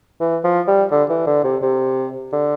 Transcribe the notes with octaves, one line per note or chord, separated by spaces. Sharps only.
E3
F3
G3
D3
E3
D3
C3
C3
D3